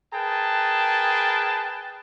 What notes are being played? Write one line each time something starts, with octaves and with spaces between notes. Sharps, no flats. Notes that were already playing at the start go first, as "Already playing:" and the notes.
G#4 A#4 B4 G5 A5